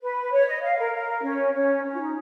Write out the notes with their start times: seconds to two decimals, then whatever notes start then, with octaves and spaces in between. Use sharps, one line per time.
0.02 B4
0.32 C#5
0.47 D#5
0.62 F5
0.78 A#4
0.93 A#4
1.23 C#4
1.54 C#4
1.84 C#4
1.92 F4
1.99 D#4